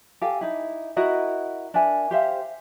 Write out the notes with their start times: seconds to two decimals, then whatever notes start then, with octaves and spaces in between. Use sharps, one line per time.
0.22 G4 A4 F5 G#5
0.41 D#4 E4
0.97 E4 F#4 A#4 D#5
1.74 D4 A#4 E5 G#5
2.11 G4 C5 E5 F5